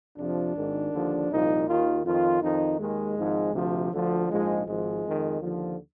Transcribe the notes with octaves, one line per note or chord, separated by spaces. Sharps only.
F2 C3 F3 D4
G#1 G#2 D#3
D#2 D3 F3
C2 A#2 F3 D#4
D#2 D#3 F4
F2 D#3 F4
F2 D#3 D#4
D#2 D#3 G#3
G#1 G#2 F3
D2 C3 F3
D2 D3 F3
A#1 G#2 F3 G#3
G#1 G#2 F3 G#3
F2 D#3
D#2 D3 F3